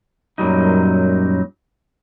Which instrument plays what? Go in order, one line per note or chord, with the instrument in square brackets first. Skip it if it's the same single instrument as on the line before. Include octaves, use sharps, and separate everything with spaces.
[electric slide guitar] F#2 A#2 F#3 G3 D#4